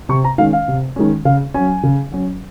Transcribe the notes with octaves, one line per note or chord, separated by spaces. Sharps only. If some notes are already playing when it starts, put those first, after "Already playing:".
C3 C#6
A#5
D#3 G#3 C#4 F5
F5
C3
D#3 G#3 C#4
C#3 F5
F#3 C#4 G#5
C#3
F#3 C#4